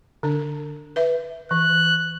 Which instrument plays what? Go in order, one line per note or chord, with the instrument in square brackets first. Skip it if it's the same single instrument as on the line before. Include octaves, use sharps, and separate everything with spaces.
[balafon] D3 D4
B4 E5
[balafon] E3 [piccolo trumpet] F#6